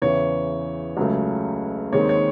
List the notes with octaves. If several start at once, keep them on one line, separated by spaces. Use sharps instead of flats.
E2 C#3 E3 C#5
C#2 C#3 F#3 A3
D#2 D#3 G#3 C4 C#5
C#5